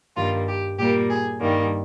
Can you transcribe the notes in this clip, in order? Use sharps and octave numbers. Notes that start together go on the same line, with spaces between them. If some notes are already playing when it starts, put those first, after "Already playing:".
G2 D#3 G3 A#3 F4
G4
A#2 G3 A#3 G4
G#4
G2 D#3 G3 A#3